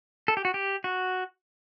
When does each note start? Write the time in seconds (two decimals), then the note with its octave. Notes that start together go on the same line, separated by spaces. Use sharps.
0.28 A4
0.37 G4
0.45 F#4
0.54 G4
0.84 F#4